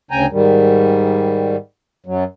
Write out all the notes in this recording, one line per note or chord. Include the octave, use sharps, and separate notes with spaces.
D2 C#3 G5 G#5 A#5
G#2 D#3 G3
F#2 F#3